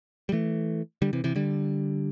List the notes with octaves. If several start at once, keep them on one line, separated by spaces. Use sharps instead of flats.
G3
E3 A3
D3 G3
C3 E3
C3 E3
D3 G3